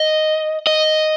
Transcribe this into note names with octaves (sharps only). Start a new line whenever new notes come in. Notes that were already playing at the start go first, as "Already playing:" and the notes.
Already playing: D#5
D#5